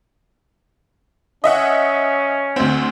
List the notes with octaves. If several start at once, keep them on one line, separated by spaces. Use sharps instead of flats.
C#4 D#5 E5 F#5
D2 C4